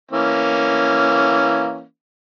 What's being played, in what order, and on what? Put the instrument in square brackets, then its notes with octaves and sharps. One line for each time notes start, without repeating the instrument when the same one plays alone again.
[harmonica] E3 A#3 C#4